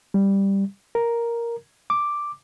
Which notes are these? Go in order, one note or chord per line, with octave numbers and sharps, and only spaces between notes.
G3
A#4
D6